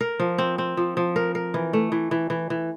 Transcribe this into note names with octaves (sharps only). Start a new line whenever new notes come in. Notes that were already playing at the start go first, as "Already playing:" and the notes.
A#4
F3
C4
C4
F3
F3
A#4
A#4
E3
A3
E3
E3
E3
E3